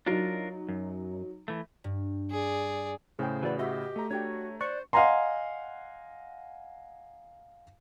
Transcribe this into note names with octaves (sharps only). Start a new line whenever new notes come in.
F#3 D4 D#4 F4 A#4
F#2
E3 A3
G2
G#4 D5
A2 C#3 G#4 C5 G5
E3 F#4 B4 D5
F#4 G4 D#5 E5
A3 A#5
D4 F#4 G4 C#5 G5
C5 D5 C#6 F#6
D#5 F5 F#5 G#5 A#5 C6